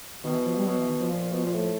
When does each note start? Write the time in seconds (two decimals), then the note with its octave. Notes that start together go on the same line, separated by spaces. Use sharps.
0.23 B2 D#3
0.34 E3
0.45 F3
0.57 G3
0.66 B2 F#3
0.78 E3
0.88 D#3
1.00 F3
1.10 A#2
1.21 A#2
1.31 B2
1.43 A#2
1.53 A2